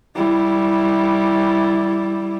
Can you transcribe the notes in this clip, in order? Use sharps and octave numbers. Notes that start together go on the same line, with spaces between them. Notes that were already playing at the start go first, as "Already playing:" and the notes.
G3 E4